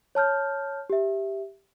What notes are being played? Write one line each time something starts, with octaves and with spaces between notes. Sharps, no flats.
C#5 A5 F6 G6
G4 E5